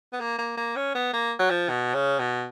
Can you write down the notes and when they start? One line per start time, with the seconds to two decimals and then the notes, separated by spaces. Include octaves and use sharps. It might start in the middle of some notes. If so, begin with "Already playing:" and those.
0.13 B3
0.20 A#3
0.38 A#3
0.57 A#3
0.76 C#4
0.95 B3
1.13 A#3
1.39 F#3
1.50 F3
1.69 B2
1.94 C#3
2.19 B2